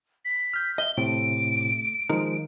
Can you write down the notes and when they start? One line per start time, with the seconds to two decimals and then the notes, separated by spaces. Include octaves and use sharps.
0.25 B6
0.53 F6 G6
0.78 D#5 E5 G7
0.97 A2 C3 A3 C4 D7
2.09 D#3 F3 G#3 D#4 A#4